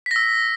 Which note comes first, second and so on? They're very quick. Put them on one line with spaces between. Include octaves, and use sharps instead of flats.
B6 A#6 E6